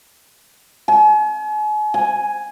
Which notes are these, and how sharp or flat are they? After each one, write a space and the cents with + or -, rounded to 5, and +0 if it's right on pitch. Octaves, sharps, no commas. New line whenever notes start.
G#5 +40
G#5 +0